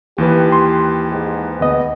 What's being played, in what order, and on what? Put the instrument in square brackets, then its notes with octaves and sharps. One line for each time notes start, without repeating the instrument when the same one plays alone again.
[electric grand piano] D#2 E3 B4 [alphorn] G4
[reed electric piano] C6
[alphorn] G#2
[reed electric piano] D2 D#5 [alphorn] B3